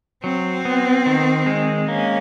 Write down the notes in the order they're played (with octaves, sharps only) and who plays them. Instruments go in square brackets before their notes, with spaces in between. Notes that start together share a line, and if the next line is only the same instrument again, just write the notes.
[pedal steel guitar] F#3 [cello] C4
[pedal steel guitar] B3
D#3
G#3
[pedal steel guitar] A#3 [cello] C#4